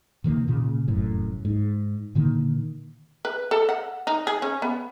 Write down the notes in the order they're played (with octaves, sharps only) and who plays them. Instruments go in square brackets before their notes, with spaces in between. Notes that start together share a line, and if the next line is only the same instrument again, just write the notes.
[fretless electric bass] C3 D#3 F#3 A#3
A#2 C#3
F1 F#2 A2
G#2
A#2 D3 D#3 A#3
[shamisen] B4
A4
F#5
D#4
G#4
C#4
B3